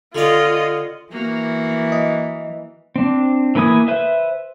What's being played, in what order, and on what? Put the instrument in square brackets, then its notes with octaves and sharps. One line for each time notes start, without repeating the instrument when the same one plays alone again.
[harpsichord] D3 C#4 D5 [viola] F4 D#5
[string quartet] E3 [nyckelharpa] A#3 F#4
[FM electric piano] D#5
[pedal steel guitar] C4 D4
E3 A#3 B4 G#5 D#6
B4 C5 E5